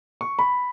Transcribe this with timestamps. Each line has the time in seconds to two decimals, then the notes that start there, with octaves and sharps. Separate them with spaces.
0.21 C#6
0.39 B5